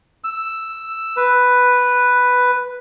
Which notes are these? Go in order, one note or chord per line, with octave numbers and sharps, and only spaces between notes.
E6
B4